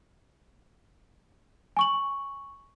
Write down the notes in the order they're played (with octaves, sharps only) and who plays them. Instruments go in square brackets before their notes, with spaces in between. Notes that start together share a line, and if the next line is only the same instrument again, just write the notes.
[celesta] G#5 C#6 F#7